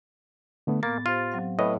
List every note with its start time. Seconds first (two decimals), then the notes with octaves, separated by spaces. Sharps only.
0.67 D3 A3 B3
0.83 A2 A#3 B3 A6
1.06 F4 G4 C5
1.32 F#3 C4 F5
1.59 A2 B4 C#5 D#5